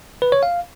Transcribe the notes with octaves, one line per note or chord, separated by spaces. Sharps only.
B4
C#5
F5